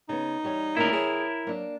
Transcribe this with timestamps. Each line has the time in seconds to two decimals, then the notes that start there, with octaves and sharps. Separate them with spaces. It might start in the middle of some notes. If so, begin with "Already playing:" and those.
0.09 C#3 B3 D#4
0.43 E2 G3 C#5
0.77 D2 C#3 A#3 E4 A#4
0.92 G#4 C#5 A5
1.47 F#3 A#3 D4